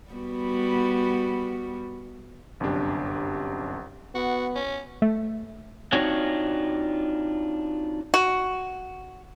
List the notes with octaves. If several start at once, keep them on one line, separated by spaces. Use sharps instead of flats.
G3 B3 F#4
G1 F#2 C3 D4 G4
B3 F#4
C#4
A3
C4 D4 D#4 F4 F#4 C#5
F#4